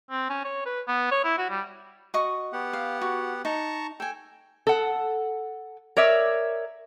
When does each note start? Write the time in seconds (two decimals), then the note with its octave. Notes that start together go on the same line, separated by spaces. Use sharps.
0.11 C4
0.30 C#4
0.45 C#5
0.66 B4
0.88 B3
1.11 C#5
1.24 E4
1.38 F#4
1.50 G3
2.14 F#4 D#5 C#6
2.53 B3 G4 F#5
2.73 F5
3.01 F#4
3.45 D#4 A5 A#5 C#6
4.00 A4 G5 G#5
4.67 A4 F#5
5.97 A#4 C#5 D5 E5